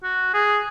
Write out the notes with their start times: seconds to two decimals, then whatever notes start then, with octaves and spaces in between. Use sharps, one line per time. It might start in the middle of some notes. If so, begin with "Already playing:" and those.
0.03 F#4
0.34 G#4